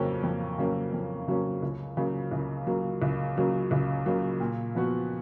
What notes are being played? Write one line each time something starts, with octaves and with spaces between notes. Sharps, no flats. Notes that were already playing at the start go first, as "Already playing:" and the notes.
Already playing: F2 C#3 F#3 A#3 C#4
F2
C#3 F#3 A#3 C#4
F2
C#3 F#3 A#3 C#4
C#2
C#3 F#3 A#3
C#2
C#3 F#3 A#3
C#2
C#3 F#3 A#3
C#2
C#3 F#3 A#3
A#2
F3 B3 F#4